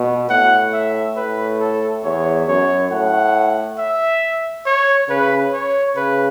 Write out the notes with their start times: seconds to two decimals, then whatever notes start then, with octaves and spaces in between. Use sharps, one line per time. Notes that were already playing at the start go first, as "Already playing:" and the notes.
Already playing: B2
0.30 A2 F#5
0.73 E5
1.17 A2 B4
1.60 A4
2.04 E2 C#5
2.48 F#2 C#5
2.91 A2 F#5
3.79 E5
4.66 C#5
5.09 C#3 B4
5.53 C#5
5.96 C#3 B4